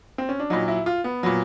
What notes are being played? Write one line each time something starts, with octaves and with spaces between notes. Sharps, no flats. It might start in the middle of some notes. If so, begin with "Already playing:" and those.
C4
C#4
D4
A#2 F#3 D#4
E4
F4
B3
A#2 F#3